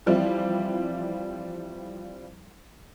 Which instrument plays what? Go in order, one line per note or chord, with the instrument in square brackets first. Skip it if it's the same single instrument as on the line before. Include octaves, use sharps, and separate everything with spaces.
[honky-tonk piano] E3 F3 G3 C4 E4 F4